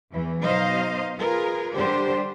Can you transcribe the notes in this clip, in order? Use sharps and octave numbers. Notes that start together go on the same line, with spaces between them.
E2 E3
B2 F#3 D#4 C5 D#5 F5
F4 G#4 A#4 B4
D3 G3 D4 G4 C5